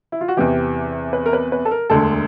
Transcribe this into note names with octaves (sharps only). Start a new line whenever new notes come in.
E4
F4
F#4
E2 C3 E3 G4
B4
A#4
B4
B4
A4
A#4
E1 D2 D3 A4